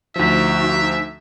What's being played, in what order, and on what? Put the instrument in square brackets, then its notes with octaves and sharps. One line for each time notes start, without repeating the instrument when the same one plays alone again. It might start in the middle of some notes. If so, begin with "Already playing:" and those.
[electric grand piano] D2 F3 [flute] D#4 [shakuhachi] F#4 [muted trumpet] E5